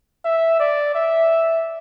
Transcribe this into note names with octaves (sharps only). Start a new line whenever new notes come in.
E5
D5
E5